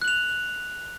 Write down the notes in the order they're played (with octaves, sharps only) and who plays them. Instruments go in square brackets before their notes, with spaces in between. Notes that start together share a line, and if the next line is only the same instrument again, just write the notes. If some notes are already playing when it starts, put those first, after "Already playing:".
[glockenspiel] F#6
F#7
F7